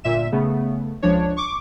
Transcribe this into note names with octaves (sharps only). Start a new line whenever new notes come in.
G1 A#2 E5 E7
C#3 A3 B3
C#2 F3 D4 C#5
C#6 D6